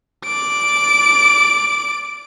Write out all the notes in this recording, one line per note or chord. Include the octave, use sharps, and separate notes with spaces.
D5 D7